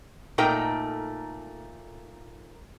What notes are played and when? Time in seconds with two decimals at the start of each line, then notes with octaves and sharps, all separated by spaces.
0.38 A#2 A3 D#4 A#4 G5 A#5